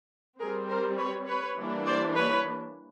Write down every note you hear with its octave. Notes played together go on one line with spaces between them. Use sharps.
G3 C4 G#4 A#4
A#4 C5
B4 C#5
B4 C#5
E3 G3 A#3 D4
C5 D5
B4 C#5